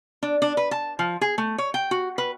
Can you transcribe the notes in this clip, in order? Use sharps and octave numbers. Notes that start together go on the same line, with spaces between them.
D4
D4
B4
A5
F3
G#4
A3
C#5
G5
F#4
B4